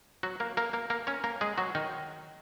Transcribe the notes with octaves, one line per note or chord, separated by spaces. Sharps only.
F#3 F#4
A#3 A#4
A#3 A#4
A#3 A#4
A#3 A#4
C#4 C#5
A#3 A#4
G#3 G#4
F#3 F#4
D#3 D#4